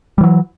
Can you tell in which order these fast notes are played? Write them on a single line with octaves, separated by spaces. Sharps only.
G3 E3 F#3